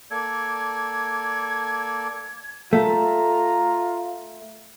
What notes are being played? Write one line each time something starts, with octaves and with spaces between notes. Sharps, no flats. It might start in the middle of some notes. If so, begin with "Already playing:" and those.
A#3 A4 D5 G#6
A3 F4 A#5